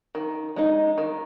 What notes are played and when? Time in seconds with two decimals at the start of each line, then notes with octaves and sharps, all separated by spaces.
0.15 D#3
0.56 G#3 D#4
0.98 D#3